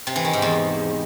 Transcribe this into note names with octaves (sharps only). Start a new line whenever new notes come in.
C3
E3
D#3
G#2
E2